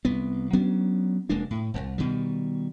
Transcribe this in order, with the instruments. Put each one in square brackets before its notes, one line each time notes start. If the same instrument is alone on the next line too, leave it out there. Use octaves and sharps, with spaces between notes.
[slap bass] C2 B3
F#3 B3 C#4 D4
F1 G#3 A#3 D4
A2
E1 C2
B2 D#3 G3